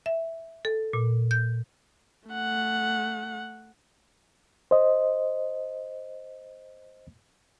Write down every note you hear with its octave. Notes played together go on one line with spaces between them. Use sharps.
E5
A4
A#2
G6
A3 F#5
C5 D#5